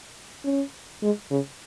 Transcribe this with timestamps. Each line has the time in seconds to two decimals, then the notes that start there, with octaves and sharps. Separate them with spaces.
0.44 C#4
1.02 G#3
1.30 C#3